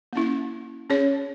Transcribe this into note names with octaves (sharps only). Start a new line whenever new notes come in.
A#3 C#4 E4
C#4 G#4 C#5